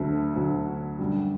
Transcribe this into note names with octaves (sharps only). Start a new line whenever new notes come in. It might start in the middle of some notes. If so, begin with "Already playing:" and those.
Already playing: D2 D3 F#3 A3
D2 D3 F#3 A3
F#2 D3 G3